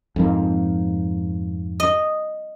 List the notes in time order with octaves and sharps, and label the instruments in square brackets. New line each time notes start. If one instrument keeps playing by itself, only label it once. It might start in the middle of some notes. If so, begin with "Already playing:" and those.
[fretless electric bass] F2 G#2 A#3
[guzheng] D#5